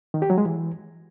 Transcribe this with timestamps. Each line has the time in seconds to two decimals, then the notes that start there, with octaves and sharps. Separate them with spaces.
0.14 D#3
0.22 G4
0.30 F#3
0.38 G#3
0.46 E3